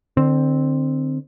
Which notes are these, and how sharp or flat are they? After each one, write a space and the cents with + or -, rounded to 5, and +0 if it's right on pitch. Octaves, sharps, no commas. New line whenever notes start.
D3 +35 C4 +0